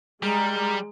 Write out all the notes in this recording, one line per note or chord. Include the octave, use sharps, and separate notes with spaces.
A#2 G3 G#3 A#4